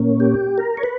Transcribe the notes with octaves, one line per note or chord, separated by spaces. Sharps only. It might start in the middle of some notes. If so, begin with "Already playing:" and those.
Already playing: A#2 A#3 C#4
G4
A#4
C#5
B4